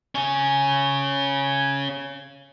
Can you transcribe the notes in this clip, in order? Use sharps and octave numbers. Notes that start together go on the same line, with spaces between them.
C#4 G#4